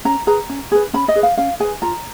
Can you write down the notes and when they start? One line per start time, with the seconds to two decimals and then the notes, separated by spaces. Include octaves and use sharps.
0.05 C#4 A#5
0.27 G#4 B4 A#5
0.49 C#4
0.72 G#4 B4
0.93 C#4 B5
1.08 D#5
1.15 G#4 B4
1.23 F5
1.37 C#4 F5
1.60 G#4 B4 G#5
1.82 F4 A#5